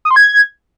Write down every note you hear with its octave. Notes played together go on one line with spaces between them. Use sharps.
D#6
C6
G#6